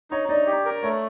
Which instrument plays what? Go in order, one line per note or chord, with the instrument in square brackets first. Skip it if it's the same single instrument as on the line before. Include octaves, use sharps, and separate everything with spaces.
[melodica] D#4 [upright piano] C#5
[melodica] D#4 [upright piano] D5
[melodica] G4
A#4
[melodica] A3 [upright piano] C#5